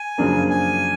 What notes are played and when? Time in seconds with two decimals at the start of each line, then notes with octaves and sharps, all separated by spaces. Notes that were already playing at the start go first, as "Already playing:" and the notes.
Already playing: G#5
0.18 F#2 C#3 F3 A#3 D4
0.50 G#5